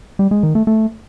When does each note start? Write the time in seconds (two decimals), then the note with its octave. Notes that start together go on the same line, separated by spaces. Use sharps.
0.19 G3
0.31 G#3
0.43 D#3
0.55 A3
0.67 A3